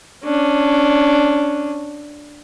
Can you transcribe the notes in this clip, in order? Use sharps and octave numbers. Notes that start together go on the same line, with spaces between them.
C#4 D4